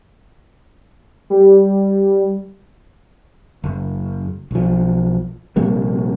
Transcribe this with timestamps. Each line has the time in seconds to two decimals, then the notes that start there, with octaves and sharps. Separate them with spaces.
1.30 G3
3.64 F#1
4.51 B1 F3
5.56 A#1 C3 G3 A#3